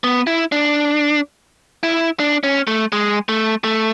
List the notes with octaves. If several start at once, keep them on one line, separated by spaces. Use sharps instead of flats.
B3
E4
D4
E4
D4
C#4
A3
G#3
A3
A3